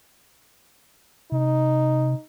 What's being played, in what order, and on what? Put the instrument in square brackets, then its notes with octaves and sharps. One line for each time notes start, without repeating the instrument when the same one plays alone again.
[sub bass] C3 [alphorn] D#4